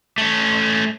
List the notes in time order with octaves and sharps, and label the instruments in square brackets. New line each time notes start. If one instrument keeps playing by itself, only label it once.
[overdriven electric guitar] A3 C#4